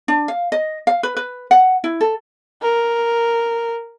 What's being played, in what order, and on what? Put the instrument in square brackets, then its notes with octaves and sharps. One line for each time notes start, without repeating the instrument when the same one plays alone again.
[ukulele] D4
F5
D#5
F5
B4
B4
F#5
E4
A4
[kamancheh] A#4